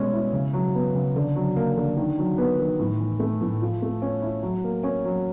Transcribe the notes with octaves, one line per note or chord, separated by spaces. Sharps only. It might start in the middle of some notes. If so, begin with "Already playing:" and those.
Already playing: B2 G3 G#3 C#4
E4
C#3
F#3
B3
C#3
D3
F#3
A#3
D3
D#3
F#3
B3
D#3
A2
E3
A3
A2
F3
A3
C#4
E4
F#3
A#3
C#4
F#3